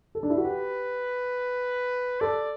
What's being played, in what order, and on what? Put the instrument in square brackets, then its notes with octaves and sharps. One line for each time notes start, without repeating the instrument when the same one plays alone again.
[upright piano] A4
D4
E4
F#4
[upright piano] G4 [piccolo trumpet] B4
[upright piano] A4 [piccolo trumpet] D5